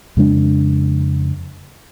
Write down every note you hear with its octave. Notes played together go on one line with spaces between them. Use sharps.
F2 C#3 G#3 D4